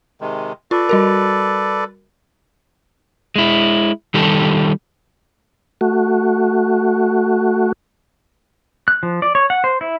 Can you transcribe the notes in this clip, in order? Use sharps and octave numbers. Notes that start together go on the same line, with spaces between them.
C3 D#3 G#3
F4 A4 B4 D5
G3 F#4 A#4
G#3 E4
D#3 G3 G4 A4
A3 F#4
F#6
F3
D5
C#5
F#5
C5
E4